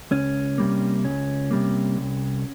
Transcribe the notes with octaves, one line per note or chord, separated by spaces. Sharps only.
C#2 C#4
C3 G3 A#3
C#2 C#4
C3 G3 A#3
C2